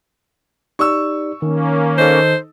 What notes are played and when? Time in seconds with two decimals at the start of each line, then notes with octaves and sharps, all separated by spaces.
0.79 D#4 G4 D5 C#6 E6
1.42 D#3 A#3 C#4
1.98 D#4 A4 C5